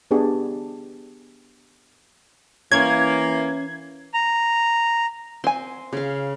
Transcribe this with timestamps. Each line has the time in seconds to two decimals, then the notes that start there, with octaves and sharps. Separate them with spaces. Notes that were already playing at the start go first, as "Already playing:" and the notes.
0.11 B3 D4 G4 G#4
2.72 E3 A#3 C#4 G#6
4.14 A#5
5.44 C4 G#5 C6
5.93 C#3 F5